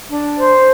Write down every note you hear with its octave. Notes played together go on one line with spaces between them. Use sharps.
D4
C5